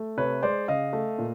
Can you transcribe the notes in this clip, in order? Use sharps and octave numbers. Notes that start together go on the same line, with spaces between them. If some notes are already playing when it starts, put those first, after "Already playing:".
Already playing: A3
C3 B4 C#5
G#3 C5 D5
C#3 D#5 F5
A3
A#2